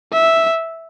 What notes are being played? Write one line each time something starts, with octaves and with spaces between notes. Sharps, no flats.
E5